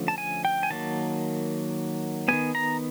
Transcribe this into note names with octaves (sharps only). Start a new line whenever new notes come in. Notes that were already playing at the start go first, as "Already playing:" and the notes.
Already playing: D3 F3 A3 C#4
A5
G#5
G5
G#5
D#3 F#3 A#3 A5
D#3 G3 B3 G#5
A#5